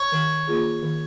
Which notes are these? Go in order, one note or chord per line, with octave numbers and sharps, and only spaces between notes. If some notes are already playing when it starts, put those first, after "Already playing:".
Already playing: C#5
D#3
A#3 F4 G#4
D#3